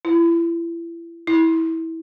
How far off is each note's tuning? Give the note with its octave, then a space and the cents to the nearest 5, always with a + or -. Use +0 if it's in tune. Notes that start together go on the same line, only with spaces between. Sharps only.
E4 +30
E4 -20